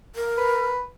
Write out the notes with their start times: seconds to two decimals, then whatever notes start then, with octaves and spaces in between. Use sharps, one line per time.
0.15 A#4
0.37 B4